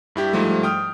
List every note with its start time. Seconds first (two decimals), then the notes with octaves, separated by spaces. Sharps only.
0.16 G2 E4 G4
0.33 G#2 F3 G3 A3
0.63 G5 D#6 F6